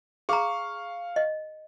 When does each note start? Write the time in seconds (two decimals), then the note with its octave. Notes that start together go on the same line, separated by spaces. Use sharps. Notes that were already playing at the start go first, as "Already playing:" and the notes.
0.29 G#4 F5 A#5 C#6
1.16 D#5